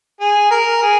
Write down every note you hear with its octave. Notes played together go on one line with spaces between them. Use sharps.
G#4
A#4
G#4